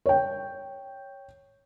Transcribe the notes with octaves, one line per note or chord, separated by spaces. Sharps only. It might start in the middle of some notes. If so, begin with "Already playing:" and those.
C#5 G5